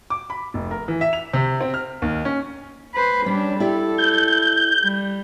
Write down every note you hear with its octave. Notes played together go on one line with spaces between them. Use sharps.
D6
B5
F1
A#4
E3
E5
F7
C3
C4
F6
D#2
C#4
B4 C5
G3 C#4 D4
E4 G4 A4 D5
G6
G3